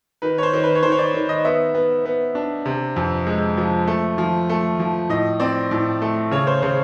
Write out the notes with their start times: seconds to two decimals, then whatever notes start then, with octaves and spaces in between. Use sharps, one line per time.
0.22 D#3 B4
0.38 C#5
0.43 C5
0.53 D#3
0.64 B4
0.75 C#5
0.83 D#3 C5
0.92 C#5
0.98 D5
1.14 D#3
1.29 D#5
1.45 B3 E5
1.75 B3
2.05 B3
2.35 D4
2.65 C3
2.96 F2
3.27 G#3
3.57 F3
3.87 A3
4.18 F3
4.49 A3
4.80 F3
5.09 A2 D#5
5.40 C4 D5
5.71 A2
6.02 A3
6.31 C#3 C#5
6.47 C5
6.62 C#3 C5